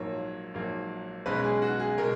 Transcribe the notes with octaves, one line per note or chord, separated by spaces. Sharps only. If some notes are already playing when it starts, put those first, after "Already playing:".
Already playing: A#1 G#2 F#3 A#3 C#5
A#1 G#2 F#3 A#3
B1 B2 G#3 C#4 B4
G#4
F#4
G#4
B2 G#3 A#4